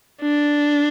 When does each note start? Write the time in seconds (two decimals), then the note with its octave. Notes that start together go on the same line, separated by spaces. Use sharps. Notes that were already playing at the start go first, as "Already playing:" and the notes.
0.22 D4